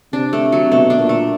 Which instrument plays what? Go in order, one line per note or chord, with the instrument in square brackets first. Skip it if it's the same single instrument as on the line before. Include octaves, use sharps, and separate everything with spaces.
[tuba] C3 [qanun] D4
[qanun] A3
F#3
[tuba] B2 [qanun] A3
[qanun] D4
[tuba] A#2
[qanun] A3